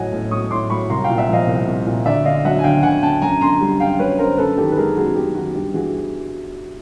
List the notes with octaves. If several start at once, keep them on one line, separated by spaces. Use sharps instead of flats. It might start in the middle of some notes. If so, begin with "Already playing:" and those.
Already playing: A2 F#3 C#5 D#5 F#5 G#5
A2
F#3 C#6 D#6
A2 C6 D6
F#3 B5 C#6
C2 A#5 C6
F5 G5
A#2
E5 F#5
F3 D#5 F5
C2
C2
A#2
D2 D5 E5
D3 D#5 F5
F#3 E5 F#5
G#5
D2 F5 G5
D2 F#5 G#5
D3 G5 A5
F#2 G#5 A#5
D3 A#5 C6
G3
F#2 F5 G5
F#2 B4 C#5
D3 A#4 C5
F#2 A4 B4
D#3 G4 A4
B4
G#3 G#4 A#4
F#2 F#4 G#4
F#2 G4
D#3 F#4
G2 G4
E3 F#4 G#4